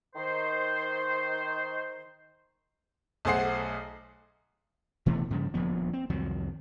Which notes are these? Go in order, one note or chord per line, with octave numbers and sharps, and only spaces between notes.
D#3 C5
B1 A3 G#4 C5 F#5 C7
B2 E3 A3 B3
G2 C#3 F3
D#1 D2 F3 B3
C4
C2 F2 D#3 F#3